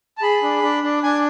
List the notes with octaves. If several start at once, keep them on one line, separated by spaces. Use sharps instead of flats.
A5
G#4 B5
D4
D4
D4
D4 G#5